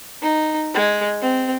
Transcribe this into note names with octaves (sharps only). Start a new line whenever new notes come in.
D#4
G#3
C4